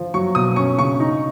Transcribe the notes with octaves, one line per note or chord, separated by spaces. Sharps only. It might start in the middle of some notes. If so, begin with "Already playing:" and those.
Already playing: F3
F#3 C#6
B2 D#6
C#4 C#6
C#3 C#6
D#4